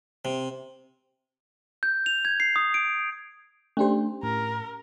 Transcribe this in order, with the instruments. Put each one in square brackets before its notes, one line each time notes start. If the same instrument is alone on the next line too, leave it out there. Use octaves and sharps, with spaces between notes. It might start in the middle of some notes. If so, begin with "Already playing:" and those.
[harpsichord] C3
[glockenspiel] G6
F7
G#6
C7
D#6
D7
[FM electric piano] A3 D4 C5 [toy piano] C#4 G4
[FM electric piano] A2 [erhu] A#4